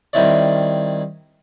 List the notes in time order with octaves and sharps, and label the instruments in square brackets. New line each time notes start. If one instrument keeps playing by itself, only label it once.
[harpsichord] D#3 G3 C4 E4 C#5 D5